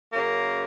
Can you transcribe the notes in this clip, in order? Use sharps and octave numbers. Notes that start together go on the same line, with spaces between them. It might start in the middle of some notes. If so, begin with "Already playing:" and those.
F#2 C#3 A#3